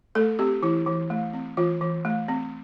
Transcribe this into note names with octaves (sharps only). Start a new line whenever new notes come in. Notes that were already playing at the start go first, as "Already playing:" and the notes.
A3 A4
C4 G4
E3 E4
E3
A3
C4
E3 F4
E3
A3
C4